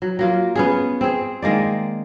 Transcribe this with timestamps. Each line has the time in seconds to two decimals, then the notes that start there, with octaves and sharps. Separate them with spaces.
0.02 F#3
0.19 F#3 A#3 F4
0.55 B3 C#4 G#4
1.01 C4 G#4
1.42 D#3 G#3 A#3 D5